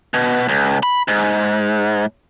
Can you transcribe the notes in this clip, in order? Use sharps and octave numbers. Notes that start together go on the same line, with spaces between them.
B2
C#2
B5
G#2